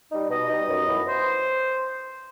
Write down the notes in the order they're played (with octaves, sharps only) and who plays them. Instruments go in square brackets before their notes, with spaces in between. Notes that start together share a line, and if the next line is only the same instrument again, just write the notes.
[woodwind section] G3 D#4
B2 D#5
G3 D#4
F#2
E3 B3 E4
C5